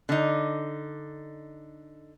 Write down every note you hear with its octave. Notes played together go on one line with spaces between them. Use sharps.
D3 D#4